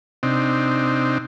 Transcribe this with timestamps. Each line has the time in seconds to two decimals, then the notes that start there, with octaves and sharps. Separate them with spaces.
0.23 C3 C4 D4 D#4